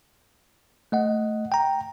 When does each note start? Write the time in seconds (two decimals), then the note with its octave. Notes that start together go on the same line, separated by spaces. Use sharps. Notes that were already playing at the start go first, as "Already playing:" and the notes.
0.92 A3 D#5 F#5
1.52 G5 A#5